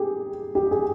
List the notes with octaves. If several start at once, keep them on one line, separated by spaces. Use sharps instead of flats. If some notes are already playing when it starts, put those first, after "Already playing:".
Already playing: G4 G#4
G4
G#4